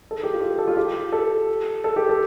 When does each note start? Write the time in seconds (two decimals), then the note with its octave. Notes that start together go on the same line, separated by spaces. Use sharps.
0.11 A4
0.23 G4
0.33 F4
0.41 G4
0.59 A4
0.68 F4
0.77 G4
1.12 A4
1.84 A4
1.96 G4
2.09 A4